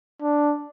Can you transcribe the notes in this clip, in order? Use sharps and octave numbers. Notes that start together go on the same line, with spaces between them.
D4